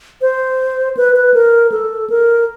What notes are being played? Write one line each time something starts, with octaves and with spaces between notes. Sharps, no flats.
C5
B4
B4
A#4
A4
A#4